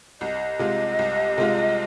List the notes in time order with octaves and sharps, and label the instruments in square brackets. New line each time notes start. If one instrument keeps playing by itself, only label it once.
[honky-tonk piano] C2 [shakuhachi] D#5
[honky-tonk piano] C3 G#3 F4
C2
C3 G#3 F4